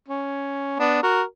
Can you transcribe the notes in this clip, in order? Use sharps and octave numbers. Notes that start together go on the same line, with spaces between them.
C#4
B3 D4
F#4 A#4